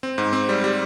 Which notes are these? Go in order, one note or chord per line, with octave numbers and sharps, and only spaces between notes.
C4
G#2
C4
G3
G3